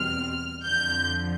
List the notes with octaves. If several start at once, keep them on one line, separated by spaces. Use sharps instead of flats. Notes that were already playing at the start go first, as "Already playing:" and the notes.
Already playing: E2 B2 G3 C4 F6
F2 D3 F3 G6